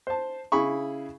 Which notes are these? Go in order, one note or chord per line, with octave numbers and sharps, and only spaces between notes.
C5 A5
C#3 E4 G#4 B5 C#6